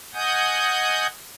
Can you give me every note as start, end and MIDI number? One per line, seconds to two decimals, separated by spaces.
0.14 1.07 75
0.14 1.07 78
0.14 1.07 80
0.14 1.07 87
0.14 1.07 91